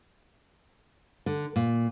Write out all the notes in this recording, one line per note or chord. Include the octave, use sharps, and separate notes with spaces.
D3
A#2